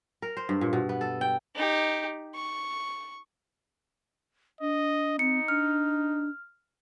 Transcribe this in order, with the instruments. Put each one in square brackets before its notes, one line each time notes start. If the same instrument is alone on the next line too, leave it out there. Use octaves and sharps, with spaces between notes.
[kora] A#4
C5
G2
A#2
B2
B3
A4
G5
[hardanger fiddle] D#4 G4
C#6
[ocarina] D4 [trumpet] D#5
[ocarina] C4 [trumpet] D#4 [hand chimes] C#7
[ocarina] D4 [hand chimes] F6